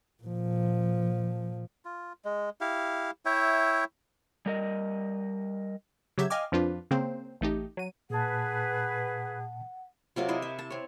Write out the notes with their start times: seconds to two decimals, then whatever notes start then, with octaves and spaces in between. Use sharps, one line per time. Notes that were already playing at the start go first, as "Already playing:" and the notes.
0.24 A#2 F3
1.85 F4
2.25 G#3
2.61 E4 G4 F5
3.25 E4 C#5 E5 G5
4.46 G3 A#4 D#5
6.18 C#3 F#3 G4 E5 G#6
6.30 D#5 F5 G5 G#5 D6 F6
6.52 F2 F3 D4 F4 B4
6.91 C#3 A#3 C4 C5
7.41 A1 A3 D#4 G4
7.77 F#3 D#7
8.10 A#2 G#4 B4 F#5 A5
10.16 C3 F#3 F4 A#4
10.28 E4 C5 D#5
10.42 E5
10.59 A5
10.70 C4 C#5